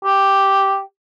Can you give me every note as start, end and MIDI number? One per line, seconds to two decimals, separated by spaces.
0.05 0.80 67